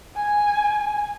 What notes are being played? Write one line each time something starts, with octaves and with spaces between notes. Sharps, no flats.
G#5